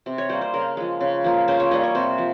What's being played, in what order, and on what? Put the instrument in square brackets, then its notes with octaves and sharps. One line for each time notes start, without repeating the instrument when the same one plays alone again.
[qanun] C3
C#5
G3 A#3 C5
C5
C#3 A#4
F3 G#3
C#3
F3 A#3
C#3 C5
C#5
G3 A#3 D#5
C#5
C3 C5
F3